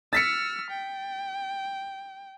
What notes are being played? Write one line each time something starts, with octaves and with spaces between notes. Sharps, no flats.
E6 F6 A6 B6 C#7
G5